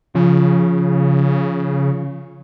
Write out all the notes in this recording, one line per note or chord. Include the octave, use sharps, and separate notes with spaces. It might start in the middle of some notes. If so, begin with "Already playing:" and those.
C#3 F3